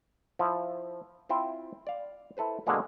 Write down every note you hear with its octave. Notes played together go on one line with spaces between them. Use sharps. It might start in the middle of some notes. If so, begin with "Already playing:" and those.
F3 E4
C4 E4 F4 C5 G5
D5 F5
E4 A4 B4 C5
B2 D3 F#3 G#3 A#3 C4